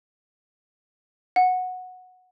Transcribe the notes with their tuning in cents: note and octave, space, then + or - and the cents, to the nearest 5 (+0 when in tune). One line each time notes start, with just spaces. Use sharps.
F#5 -10